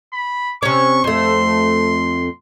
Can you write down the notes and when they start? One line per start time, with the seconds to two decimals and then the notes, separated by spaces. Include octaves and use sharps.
0.13 B5
0.63 C3 C#4 C#6
1.04 F2 A3 C6